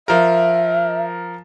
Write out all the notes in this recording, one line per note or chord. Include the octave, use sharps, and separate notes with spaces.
F3 A#4 E5